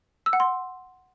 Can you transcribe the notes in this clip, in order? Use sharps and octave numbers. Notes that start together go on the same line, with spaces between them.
E6
F#5
C6